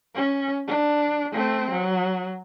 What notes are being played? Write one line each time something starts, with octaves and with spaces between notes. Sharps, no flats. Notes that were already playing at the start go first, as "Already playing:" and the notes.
C#4
D4
A3 C4
F#3